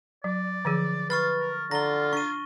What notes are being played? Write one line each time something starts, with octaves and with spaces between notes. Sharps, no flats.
F#3 D5
D3 F3 G#4
F4 B4 B5 C#6 F6 A6
A#4
D3 F4 A#5 A#6 G7
D4 C#6 D#7